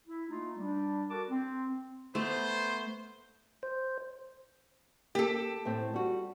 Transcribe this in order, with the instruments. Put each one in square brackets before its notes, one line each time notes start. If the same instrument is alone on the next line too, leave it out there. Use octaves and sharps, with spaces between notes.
[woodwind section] E4
A3 A#3 D#4 F4
G3 D4
F#4 A4 A#4 A5 D6
C4
[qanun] A3 [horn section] B3 C5
[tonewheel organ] C5
[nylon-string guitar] A#3 [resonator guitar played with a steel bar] G4 A4
[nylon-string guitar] A2 A3 C4
G3 F#4